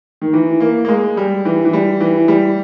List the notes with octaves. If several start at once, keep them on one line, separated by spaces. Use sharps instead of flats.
D#3
E3
A#3
A#3
G#3
G3
E3
E3
G3
E3
G3